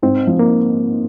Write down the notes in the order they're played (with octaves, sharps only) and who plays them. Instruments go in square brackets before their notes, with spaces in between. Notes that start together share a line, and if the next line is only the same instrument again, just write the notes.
[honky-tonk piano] G#2 [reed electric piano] C4
[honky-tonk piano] F3
[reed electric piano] A#3